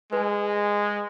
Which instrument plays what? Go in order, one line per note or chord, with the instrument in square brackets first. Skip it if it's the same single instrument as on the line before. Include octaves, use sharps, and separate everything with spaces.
[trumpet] G#3 [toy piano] B4 G#5